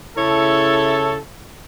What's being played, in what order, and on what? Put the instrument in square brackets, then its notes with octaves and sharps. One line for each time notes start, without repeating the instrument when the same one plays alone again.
[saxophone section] C#3 E4 [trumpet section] A4 [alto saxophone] C#5